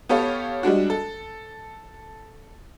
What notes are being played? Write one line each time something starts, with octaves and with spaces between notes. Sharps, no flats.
B3 G4 A4 C#5 F5
G3 G#3 D4 F#4
A4